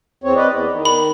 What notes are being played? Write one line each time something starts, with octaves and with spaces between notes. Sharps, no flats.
E2 C4 C#5
B4 D5 D#5
E2
D#3
B5